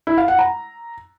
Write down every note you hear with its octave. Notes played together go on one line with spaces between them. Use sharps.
E4
F5
F#5
A#5